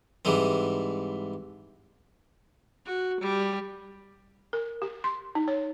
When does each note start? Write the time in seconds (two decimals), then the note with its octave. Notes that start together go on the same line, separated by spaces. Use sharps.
0.25 G#2 E3 G3 G#3 C4
2.86 F#4
3.21 G3
4.53 A#4
4.82 G4
5.04 C6
5.35 D#4
5.48 C#5